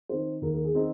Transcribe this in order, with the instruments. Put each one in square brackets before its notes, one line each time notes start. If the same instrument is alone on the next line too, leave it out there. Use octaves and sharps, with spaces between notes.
[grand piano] D#3 C4 D#4 C5
D#2 A#4
A#4
G#4
D#3 C4 D#4